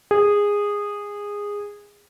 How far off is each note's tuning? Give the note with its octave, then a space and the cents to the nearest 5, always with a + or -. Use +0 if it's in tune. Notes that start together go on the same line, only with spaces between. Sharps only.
G#4 -15